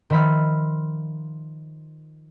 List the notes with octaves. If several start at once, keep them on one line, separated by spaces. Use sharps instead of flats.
D#3 F3 E5 B5 F6